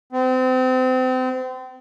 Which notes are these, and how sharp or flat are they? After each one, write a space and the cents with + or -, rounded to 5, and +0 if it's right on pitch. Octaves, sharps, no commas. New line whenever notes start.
C4 -30